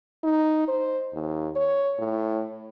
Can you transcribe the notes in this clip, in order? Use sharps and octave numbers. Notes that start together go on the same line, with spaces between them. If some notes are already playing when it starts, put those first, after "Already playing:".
D#4
C5
D#2
C#5
A2